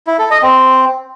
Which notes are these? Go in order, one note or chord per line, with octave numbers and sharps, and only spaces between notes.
E4
A4
D#5
C4